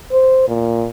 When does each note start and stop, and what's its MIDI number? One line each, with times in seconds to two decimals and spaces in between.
0.12 0.45 72
0.48 0.88 46